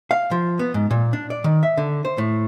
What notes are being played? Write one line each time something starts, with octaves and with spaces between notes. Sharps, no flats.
F5
F3
B3
G#2
A#2
D4
D5
D#3
E5
D3
C5
A2